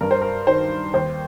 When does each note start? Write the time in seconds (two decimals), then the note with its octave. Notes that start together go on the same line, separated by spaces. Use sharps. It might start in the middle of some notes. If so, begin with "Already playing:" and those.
0.01 G2 A#4
0.11 C5
0.22 A#4
0.47 D#3 C5
0.94 D#2 C5